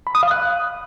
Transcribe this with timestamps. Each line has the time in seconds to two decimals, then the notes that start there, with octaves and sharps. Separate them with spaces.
0.07 B5
0.15 D#6
0.23 F5
0.31 F#6